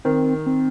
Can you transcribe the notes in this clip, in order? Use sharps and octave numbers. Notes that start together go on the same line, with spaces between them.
D#3 C4
C4